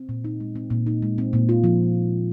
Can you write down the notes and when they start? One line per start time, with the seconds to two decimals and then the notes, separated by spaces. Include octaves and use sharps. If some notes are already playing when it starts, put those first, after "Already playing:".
Already playing: C4
0.09 A#2
0.24 D#4
0.40 G#3
0.55 C4
0.70 A#2
0.86 D#4
1.02 G#3
1.18 C4
1.33 A#2
1.49 F4
1.64 F3